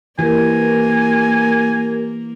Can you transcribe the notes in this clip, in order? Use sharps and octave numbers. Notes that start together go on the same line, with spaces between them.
E3 A#3 G4 A#4 G#5